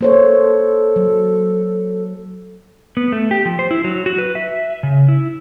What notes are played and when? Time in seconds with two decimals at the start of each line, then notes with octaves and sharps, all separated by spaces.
0.01 A#3 A4 C5 C#5
0.96 F#3
2.97 B3
3.12 A3
3.31 G4
3.45 F3
3.59 C5
3.71 E4
3.84 F#3
4.06 F#4
4.18 B4
4.35 E5
4.83 C#3
5.09 E4